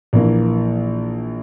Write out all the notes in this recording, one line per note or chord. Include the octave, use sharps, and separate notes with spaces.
A#1 E3 A#3